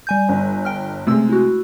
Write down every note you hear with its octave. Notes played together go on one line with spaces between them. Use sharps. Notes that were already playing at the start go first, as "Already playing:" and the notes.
G3 G#5 G6
G1
G5 F6
C3 G#3 A3 E6
E4 F#4